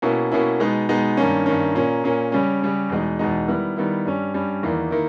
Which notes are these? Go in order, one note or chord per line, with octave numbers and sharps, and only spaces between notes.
B2 A#3 C#4 E4
B2 A#3 C#4 E4
B2 G#3 B3 D#4
B2 G#3 B3 D#4
G2 D#3 A#3 C#4
G2 D#3 A#3 C#4
A#2 A#3 C#4
A#2 A#3 C#4
C#3 G3 C#4
C#3 G3 C#4
E2 B2 G#3 D#4
E2 B2 G#3 D#4
D#3 G3 B3 E4
D#3 G3 B3 E4
G2 G3 C#4
G2 G3 C#4
E2 D#3 A#3 E4
D#3 A#3 E4